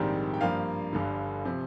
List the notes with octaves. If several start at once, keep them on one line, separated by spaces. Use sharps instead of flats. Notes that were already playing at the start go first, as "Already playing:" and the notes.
Already playing: A#1 G#2 D#3 G3 C4
G5
G2 F3 A#3 F5
G1 G2 D3
C3 F3